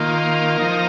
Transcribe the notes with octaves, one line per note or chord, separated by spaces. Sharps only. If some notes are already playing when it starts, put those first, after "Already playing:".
Already playing: D#3 A#3 F4
F3 D#4 A#4